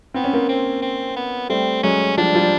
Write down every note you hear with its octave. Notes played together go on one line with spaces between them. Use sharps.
B3 C4
C#4
A#3 C4
C4
C4
B3
G3 A3 C4
F#3 G#3 C#4
F3 G3 D4
F3 G3